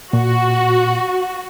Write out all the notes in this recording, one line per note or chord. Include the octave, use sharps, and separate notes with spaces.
A#2 F#4